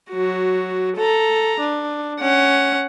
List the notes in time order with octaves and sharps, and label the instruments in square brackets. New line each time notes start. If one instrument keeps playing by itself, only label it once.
[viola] F#3 F#4
A4 A#5
D4
C#4 F#5